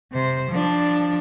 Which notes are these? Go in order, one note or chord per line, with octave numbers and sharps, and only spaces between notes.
C3 C5
F3 D4